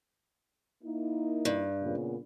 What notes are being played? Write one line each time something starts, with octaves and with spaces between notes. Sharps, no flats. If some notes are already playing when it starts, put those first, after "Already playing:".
A#3 D#4 E4
G2
A#2 C#3 B3